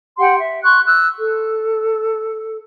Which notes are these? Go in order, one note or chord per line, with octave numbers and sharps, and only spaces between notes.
G4 F#5 G5 C6
E5
C6 C#6 F#6
E6 F#6
A4